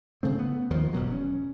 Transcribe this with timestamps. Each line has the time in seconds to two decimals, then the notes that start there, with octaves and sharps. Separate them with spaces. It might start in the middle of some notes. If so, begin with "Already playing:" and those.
0.23 C#3 A3 C4
0.39 B3
0.71 D#2 D#3 F3
0.93 E1 G2 B2 F#3
1.12 C#4